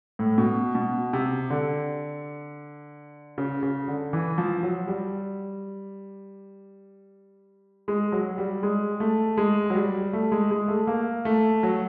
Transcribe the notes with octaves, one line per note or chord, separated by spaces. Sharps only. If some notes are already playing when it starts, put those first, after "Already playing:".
A2
B2
B2
C3
D3
C#3
C#3
D3
E3
F3
F#3
G3
G#3
F#3
G3
G#3
A3
G#3
F#3
G3
A3
G#3
G#3
A3
A#3
A3
F#3